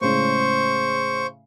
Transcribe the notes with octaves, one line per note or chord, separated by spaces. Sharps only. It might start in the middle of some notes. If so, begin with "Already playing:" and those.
A2 C#3 G#3 C5 C#6